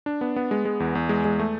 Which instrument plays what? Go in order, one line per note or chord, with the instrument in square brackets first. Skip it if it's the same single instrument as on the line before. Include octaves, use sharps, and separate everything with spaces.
[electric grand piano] D4
B3
B3
G#3
G#3
E2
E2
G#3
G#3
A3